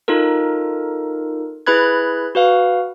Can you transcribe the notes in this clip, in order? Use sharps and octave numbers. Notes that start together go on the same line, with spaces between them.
D#4 F4 A4 A#4
E4 G#4 B4 B5 F#6 G#6
F#4 B4 F5